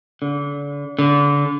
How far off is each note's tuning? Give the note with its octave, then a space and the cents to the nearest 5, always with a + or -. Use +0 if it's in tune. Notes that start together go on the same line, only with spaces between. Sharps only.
D3 -35
D3 -30